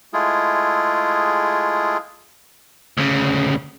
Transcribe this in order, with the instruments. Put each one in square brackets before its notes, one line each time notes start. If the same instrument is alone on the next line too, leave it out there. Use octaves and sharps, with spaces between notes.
[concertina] G#3 A3 E4 F4 G#4
[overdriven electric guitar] D2 C#3